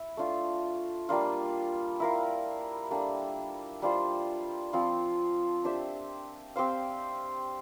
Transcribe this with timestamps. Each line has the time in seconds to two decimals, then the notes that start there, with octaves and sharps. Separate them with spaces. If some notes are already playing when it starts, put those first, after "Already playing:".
Already playing: E4
0.17 A3 D4 F4
1.09 G3 A#3 D4 F4
2.00 E4 A#4 F5
2.90 G3 A#3 D4 A4
3.82 G3 D4 F4 C5
4.73 F3 C4 F4
5.64 D4 G4 C5 E5
6.56 C4 G4 C5 F5